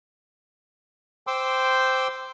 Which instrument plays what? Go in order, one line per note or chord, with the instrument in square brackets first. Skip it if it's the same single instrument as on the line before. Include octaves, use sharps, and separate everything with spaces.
[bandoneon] C5 G5 C6 D6 E6